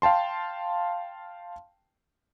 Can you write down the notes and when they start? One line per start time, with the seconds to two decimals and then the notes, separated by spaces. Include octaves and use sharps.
0.02 F5 G5 A5 C6